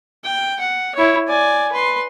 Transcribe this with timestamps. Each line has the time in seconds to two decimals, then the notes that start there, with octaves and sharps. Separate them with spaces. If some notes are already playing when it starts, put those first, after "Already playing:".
0.24 G5
0.59 F#5
0.95 E4 C#5
1.28 D5 G#5
1.72 B4 C6